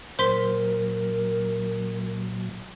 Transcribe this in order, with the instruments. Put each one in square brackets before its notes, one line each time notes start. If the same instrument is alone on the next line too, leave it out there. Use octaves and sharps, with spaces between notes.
[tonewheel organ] A#2 F#3 [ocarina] A#4 [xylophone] C5 C6 B6